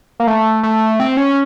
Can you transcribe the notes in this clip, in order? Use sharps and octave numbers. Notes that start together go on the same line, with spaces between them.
A#3
A3
A3
C4
C#4